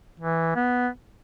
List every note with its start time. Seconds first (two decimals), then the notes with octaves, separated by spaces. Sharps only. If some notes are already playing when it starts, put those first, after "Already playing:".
0.20 E3
0.56 B3